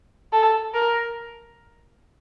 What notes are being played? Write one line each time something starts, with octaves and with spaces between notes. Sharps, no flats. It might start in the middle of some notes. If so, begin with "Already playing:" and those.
A4
A#4